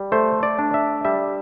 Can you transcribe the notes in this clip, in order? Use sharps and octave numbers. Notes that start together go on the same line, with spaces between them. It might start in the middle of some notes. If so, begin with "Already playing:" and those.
Already playing: G3
A3 C5
D5
D4
E5
G3 E5